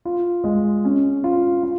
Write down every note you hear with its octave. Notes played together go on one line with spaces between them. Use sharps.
F4
G#3
C#4
F4
F4